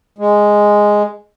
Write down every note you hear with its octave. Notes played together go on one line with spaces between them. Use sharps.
G#3